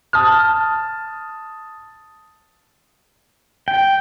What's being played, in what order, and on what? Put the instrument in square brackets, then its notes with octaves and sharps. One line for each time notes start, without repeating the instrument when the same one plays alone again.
[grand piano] A5 D#6 F6
[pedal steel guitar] G5